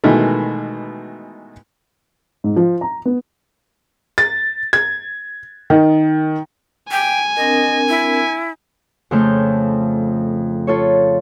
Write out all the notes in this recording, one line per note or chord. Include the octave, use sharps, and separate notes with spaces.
B2 D#3 E3 G#3 A3
G#2
F3
A#5
B3
A6
G#6
D#3
G5 G#5
C4 D4 A#4 D#5
E4
F2 C#3 F3 A3 F6 G6
F4 A4 C#5